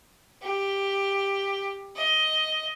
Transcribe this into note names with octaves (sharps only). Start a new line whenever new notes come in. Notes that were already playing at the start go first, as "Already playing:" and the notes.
G4
D#5